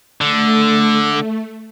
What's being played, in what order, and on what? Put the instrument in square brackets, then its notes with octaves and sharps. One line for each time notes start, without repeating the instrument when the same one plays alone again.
[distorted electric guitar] D3 [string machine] A3